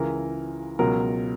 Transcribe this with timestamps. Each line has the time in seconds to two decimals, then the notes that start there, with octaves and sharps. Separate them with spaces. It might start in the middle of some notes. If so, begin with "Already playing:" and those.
Already playing: C#2 C#3 E3 A#4
0.79 C#2 B2 F#3 A#4